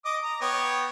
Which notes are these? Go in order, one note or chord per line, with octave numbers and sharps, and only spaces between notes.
D#5 D6 D#6
A#5
B3 C#5 G5